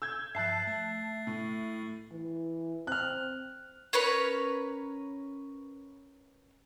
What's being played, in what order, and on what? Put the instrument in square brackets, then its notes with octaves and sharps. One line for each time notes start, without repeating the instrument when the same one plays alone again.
[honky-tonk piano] E6 G6 G#6
[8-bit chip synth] G2 F3 [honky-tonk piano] E5 A5 F#6 [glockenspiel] A6 C7
[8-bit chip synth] A3
[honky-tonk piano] A2
[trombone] E3
[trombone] C4 [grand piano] F6 F#6
[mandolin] C#4 A#4 B4 C#5